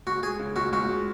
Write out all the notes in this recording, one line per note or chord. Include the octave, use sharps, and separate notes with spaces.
C#2 F#4
G#3 G#4
C#3
C#2 F#4
C#2 F#4
G#3